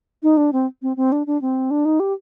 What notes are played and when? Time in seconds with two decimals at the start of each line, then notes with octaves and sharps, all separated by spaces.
0.23 D#4
0.37 D4
0.53 C4
0.82 C4
0.97 C4
1.12 D4
1.27 D4
1.41 C4
1.71 D4
1.85 D#4
2.00 G4